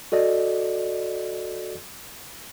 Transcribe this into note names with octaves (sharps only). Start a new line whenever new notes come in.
F#4 A4 D5 D#5